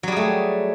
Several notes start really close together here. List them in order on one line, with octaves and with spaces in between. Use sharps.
F#3 G3 G#4 A3